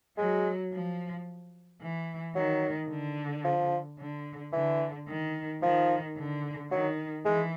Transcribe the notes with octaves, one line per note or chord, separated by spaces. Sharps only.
F#3 G#3
F3
E3
D#3 F#3
D3
F3
D3
D3 E3
D#3
D#3 F3
D3
D#3 F#3
E3 G#3